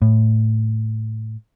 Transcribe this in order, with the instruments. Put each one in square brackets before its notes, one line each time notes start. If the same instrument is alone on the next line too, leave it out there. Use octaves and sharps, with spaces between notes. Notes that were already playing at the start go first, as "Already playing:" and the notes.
[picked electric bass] A2